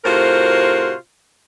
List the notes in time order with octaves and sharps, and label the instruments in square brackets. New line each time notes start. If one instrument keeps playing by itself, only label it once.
[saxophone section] A2 C3 F4 F#4 A#4 C5